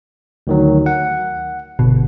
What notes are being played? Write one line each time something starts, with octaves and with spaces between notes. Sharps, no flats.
D2 D#3 F#3
F#5
G1 B2